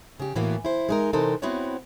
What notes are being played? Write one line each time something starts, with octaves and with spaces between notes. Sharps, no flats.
C#3 G4
A2 E3 A#3 B3 F#4
E4 C5
G#3 D#4 A#4
C3 E3 C4 D#4 A4 A#4
B3 C4 E4 F#4 C#5